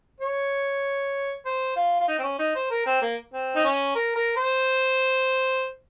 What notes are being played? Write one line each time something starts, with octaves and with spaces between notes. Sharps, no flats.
C#5
C5
F4
F4
D#4
C4
C#4
D#4
C5
A#4
C4
A#3
C4
D#4
C#4
A#4
A#4
C5